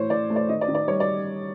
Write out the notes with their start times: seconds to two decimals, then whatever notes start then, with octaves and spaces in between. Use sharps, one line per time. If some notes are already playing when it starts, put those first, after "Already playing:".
Already playing: A2 E3 C5 C#5
0.10 A2 D5
0.30 A3
0.36 D5
0.49 D#3 D#5
0.61 D5
0.68 D#3
0.75 D5
0.87 G3 C#5
1.00 D5